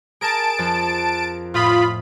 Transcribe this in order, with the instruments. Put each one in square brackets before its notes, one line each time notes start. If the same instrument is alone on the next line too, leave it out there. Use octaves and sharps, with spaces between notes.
[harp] G#4 A#4 [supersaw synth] A5 D7
[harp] F2
[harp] A2 D#6 [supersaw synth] F4 B5